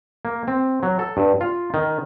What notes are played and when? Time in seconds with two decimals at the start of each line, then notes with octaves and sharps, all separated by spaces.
0.25 A#3
0.48 C4
0.83 F#3
0.99 A4
1.17 G2
1.41 F4
1.74 D#3